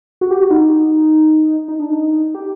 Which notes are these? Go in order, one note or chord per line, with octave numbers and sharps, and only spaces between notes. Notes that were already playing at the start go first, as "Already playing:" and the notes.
F#4
G4
F#4
D#4
D#4
D4
D#4
G4